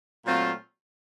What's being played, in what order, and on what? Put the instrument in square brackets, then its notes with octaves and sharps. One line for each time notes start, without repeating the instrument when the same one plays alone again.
[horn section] A#2 F#3 A3 C4 F4